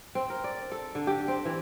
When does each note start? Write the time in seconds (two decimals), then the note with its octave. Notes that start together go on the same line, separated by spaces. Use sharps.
0.15 C4
0.30 A#4
0.44 D5
0.72 A4
0.95 D3
1.07 G4
1.28 C4
1.45 E3